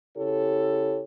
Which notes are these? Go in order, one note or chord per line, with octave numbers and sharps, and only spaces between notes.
C#3 E4 G4 A4 C#5